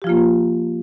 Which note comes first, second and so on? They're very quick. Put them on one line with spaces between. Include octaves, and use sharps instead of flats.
G4 F3 F4 A#3